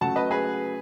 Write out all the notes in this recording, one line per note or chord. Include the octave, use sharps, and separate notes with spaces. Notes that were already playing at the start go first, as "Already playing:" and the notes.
C#3 F#3 A3 F#5 A5
B4 D#5
G#4 B4